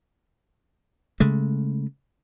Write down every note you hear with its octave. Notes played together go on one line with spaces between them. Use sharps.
C#3 G#3 A3